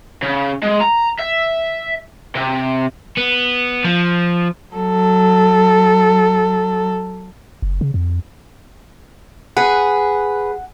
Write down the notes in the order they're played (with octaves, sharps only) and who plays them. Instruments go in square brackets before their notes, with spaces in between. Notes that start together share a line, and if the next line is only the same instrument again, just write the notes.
[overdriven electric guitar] C#3
G#3
A#5
E5
C3
B3
F3
[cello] F#3 A4
[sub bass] F#1
C#3
F2
[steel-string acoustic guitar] G#4 [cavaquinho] B4 [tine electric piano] F#5